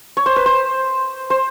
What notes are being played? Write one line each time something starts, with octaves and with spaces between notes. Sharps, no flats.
C#5
C5
B4
C5
C5